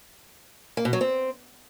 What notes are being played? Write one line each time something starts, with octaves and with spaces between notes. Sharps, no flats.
A#3
B2
F#3
C4